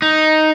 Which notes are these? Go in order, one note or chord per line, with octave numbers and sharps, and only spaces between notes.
D#4